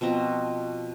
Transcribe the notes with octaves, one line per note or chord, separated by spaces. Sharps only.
B2 F3 C4 A#5